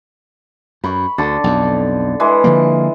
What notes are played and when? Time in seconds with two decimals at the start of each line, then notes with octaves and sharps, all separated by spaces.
0.84 F#2 B5 C#6
1.18 D2 D3 A5
1.44 B1 F2
2.20 E3 G#3
2.44 D3 F3 A#3